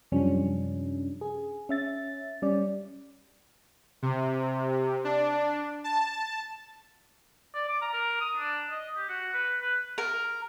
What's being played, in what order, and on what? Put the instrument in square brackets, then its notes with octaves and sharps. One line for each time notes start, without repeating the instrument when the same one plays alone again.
[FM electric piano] F#2 C3 F3 G3 C#4 D4
G#4
C#4 E5 A6
G3 C#4 D5
[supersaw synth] C3
D4
A5
[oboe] D5
D6
A#5
A#4
D#6
D4
D#5
G4
F#4
B4
B4
[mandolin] A#4